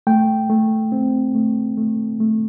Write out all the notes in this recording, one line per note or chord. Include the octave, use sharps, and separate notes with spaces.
A3 G5
A3
C4
A3
A3
A3